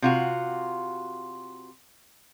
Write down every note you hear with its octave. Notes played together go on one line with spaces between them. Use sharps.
C3 F4 F#4